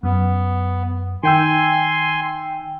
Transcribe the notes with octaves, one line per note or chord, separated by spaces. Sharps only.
F#2 B3
D#3 G5 G#5 C6 E6